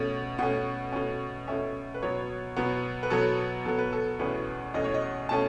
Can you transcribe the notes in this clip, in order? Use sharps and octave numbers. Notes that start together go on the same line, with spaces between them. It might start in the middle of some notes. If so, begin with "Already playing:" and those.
Already playing: B2 A3 C#4
B2 A3 C#4 F#5
B2 A3 C#4
B2 A3 C#4 E5
B4
B2 F#3 B3 C#5
B2 F#3 B3
B4
B2 F#3 B3 A4
B2 F#3 B3 A4
B4
A4
E2 B2 A3 C#4 B4
E2 B2 A3 C#4 D#5
C#5
D#5
B2 A3 C#4 A5